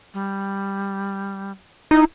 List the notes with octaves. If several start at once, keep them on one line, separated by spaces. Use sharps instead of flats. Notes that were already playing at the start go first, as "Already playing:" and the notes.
G3
D#4 E4